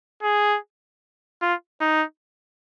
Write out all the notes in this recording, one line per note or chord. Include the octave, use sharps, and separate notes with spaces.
G#4
F4
D#4